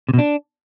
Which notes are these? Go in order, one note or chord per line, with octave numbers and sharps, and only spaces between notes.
C3
B2
D4